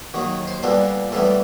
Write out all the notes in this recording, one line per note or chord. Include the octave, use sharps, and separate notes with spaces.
D#2 D#3 F#3
C5
A#2 G3 B3 D4 A4
A2 E3 G3 B3 A4